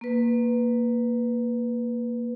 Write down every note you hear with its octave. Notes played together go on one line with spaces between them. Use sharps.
A#3 B4